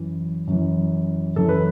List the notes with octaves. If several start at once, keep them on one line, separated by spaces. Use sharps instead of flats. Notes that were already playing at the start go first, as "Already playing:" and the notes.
Already playing: F#2 E3
F#2 E3
F#2 E3 A4
B4